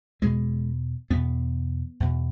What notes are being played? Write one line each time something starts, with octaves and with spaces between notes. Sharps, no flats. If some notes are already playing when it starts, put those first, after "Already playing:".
E2 B2 G#3
E2 B2 B3
E2 B2